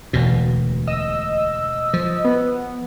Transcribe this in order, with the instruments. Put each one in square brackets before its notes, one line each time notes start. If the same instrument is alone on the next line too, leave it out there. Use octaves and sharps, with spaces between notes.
[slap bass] E1 D2 B2
[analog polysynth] D#5 E6
[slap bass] F3
[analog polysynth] B3